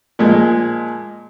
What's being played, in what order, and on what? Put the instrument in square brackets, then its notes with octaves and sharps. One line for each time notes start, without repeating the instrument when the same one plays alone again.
[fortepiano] A#2 F3 G#3